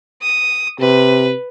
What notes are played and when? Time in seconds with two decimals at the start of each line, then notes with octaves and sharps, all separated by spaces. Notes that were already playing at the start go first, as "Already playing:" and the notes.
0.22 D#6
0.80 C3 B4